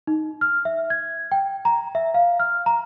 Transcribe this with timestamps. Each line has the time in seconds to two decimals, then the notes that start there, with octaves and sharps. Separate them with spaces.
0.07 D#4
0.41 F6
0.65 E5
0.90 G#6
1.32 G5
1.65 A#5
1.95 E5
2.14 F5
2.40 F6
2.66 A#5